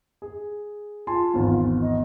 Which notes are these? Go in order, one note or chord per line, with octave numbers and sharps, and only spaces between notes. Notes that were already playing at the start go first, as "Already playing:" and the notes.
G#4
F4 G#5 A5 C6
G#1 E2
D#5